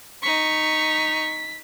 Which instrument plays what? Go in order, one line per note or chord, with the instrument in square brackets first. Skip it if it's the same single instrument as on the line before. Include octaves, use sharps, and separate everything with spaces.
[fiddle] D#4 C#6 [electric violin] B6